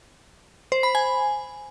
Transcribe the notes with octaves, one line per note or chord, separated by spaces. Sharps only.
C5
B5
G#5